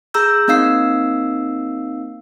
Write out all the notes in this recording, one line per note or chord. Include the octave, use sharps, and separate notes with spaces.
G#4 A#5 E6 G6
A#3 C4 D#4 F5 E6 C7